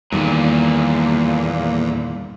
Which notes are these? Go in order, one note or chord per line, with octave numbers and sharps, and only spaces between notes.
E2 G2 A#2 D3 D#3 A#3